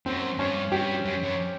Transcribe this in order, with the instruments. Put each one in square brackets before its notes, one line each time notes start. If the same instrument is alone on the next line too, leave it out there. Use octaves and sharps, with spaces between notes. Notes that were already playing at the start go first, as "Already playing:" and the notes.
[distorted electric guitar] F#2 [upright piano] C4
[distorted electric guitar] G2 [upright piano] C#4
[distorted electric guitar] G2 [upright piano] G4
[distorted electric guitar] F#2
F#2